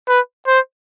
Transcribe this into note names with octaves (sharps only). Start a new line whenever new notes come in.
B4
C5